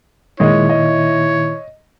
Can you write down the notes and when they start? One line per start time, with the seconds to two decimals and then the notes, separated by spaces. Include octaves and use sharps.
0.40 A#2 D#3 G#3 E4 C#5 D#5
0.69 D#5